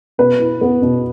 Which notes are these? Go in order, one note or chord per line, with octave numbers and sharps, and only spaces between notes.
B2 B4
E4
B3
B2